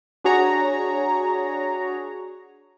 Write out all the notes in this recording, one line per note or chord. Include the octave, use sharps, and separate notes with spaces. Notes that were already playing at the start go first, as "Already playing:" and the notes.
D4 F#4 G#4 C#5 A#5